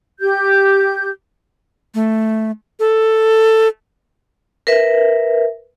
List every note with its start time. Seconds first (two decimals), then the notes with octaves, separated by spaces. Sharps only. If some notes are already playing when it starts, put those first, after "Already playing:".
0.21 G4 G6
1.95 A3
2.80 A4
4.67 A#4 B4 E5